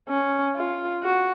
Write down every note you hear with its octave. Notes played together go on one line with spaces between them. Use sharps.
C#4
F4
F#4